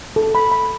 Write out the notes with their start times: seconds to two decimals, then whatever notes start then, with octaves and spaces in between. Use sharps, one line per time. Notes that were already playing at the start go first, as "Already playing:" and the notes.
0.16 A4
0.35 B5
0.51 B5